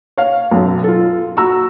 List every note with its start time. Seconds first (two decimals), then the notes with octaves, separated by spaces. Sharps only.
0.18 C#5 F5
0.51 B1 F#2
0.84 F4 A4
1.37 F#4 A#5 E6